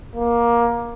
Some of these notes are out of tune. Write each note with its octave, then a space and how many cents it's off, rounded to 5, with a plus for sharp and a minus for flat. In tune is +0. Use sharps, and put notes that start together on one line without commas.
A#3 +15